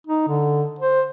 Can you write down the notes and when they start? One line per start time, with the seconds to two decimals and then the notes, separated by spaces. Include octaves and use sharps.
0.07 D#4
0.28 D3
0.79 C5